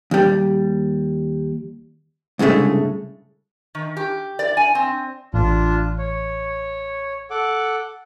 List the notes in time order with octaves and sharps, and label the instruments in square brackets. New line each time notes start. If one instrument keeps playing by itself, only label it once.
[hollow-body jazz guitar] D#2 G3
C2 G2 C#3 G#3 A3
[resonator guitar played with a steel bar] D#3
G4
D5
G#5
C4
[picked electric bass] A1 [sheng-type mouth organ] D4 F4
[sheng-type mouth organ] C#5
A4 F#5 D6